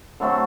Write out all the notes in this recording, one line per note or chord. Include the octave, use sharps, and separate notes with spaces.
D3 F#3 A3 C4